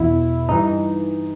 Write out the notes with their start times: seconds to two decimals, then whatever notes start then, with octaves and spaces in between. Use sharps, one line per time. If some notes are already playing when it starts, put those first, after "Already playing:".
Already playing: E2 B2 E4
0.49 G2 E3 D#4